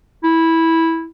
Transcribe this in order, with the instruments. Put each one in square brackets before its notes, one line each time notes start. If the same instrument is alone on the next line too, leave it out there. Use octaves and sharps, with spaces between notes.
[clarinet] E4